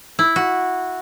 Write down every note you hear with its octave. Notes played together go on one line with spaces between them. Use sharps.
E4
F#4